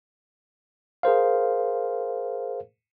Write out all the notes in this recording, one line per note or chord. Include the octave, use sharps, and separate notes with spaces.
G#4 A#4 C5 F5